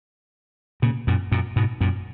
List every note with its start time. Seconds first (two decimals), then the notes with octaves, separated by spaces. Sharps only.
0.82 A#2 C#3
1.07 F#2 A#2
1.32 F#2 A#2
1.56 G#2 B2
1.81 F#2 A#2